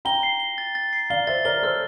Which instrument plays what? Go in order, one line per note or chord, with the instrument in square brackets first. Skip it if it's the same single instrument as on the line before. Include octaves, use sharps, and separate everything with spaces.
[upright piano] G5 A#5 [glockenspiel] G7
[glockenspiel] C7
G7
A6
A6
C7
[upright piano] D5 F5 [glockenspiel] G7
[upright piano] C5 E5 [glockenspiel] A6
[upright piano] A#4 D5 [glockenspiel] G7
[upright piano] A4 C5 [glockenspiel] F6